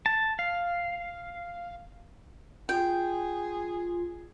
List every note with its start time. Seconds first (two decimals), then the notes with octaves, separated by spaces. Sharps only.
0.06 A5
0.39 F5
2.69 F4 G#4 G5